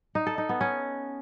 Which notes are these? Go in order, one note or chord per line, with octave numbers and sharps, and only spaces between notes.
D#4
A4
D#4
B3
C#4